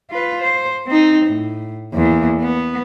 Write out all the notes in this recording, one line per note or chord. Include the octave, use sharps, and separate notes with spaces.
F4 B4
C5
C4 D#4
A2
E2 A#3
B3